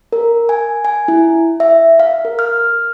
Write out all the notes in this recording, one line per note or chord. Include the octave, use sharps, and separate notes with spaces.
A#4
G#5
G#5
E4
E5
F5
A#4
F6